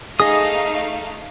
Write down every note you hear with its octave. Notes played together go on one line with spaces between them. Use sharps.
A3 D#4 G#4 D#5 F5 D#6